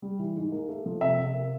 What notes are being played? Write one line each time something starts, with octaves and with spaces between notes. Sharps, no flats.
G3
E3
G#2
A#3
A3
F3
C3 E5
C3
A#3